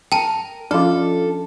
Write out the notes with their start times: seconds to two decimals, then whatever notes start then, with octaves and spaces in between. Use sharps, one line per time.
0.12 A#4 G5 A5
0.71 F3 C#4 D4 F4 A4 D6